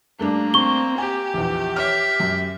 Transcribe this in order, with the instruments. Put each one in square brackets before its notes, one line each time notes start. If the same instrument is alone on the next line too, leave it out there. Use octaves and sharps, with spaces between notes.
[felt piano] G2 A3 D4 [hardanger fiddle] A#3
[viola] C4 [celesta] C#6 G7
[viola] G4 [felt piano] G#5
[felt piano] A#1 E2
[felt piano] C#5 F6 [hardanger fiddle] E5
[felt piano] F#2